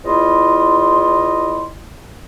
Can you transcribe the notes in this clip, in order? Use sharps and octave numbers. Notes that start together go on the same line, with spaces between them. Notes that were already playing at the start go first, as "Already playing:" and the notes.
E2 E4 F4 D#5 C6